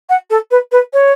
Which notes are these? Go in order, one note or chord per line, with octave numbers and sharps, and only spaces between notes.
F#5
A4
B4
B4
C#5